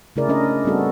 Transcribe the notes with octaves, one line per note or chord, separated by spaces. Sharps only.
C#3 A3 E4 G#4 A#4 D5
C#4 D4 A#4 D#5
G3 B3 C4 F#4 A4